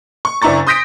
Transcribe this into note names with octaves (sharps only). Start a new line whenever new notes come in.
C#6
F#1 D4 E4 A#5 C#6 A6
C6 D#6 G6 A#6 B6 D7